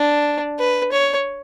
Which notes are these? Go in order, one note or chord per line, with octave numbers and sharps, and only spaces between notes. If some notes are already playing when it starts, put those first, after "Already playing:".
Already playing: D4
B4
C#5